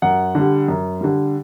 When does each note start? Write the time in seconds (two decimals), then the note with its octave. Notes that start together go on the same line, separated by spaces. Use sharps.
0.02 F#2 F#5
0.35 D3 G3
0.68 F#2
1.01 D3 G3